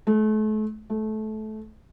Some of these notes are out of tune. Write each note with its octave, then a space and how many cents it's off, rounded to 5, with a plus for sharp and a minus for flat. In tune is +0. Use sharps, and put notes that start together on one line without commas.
A3 -35
A3 -20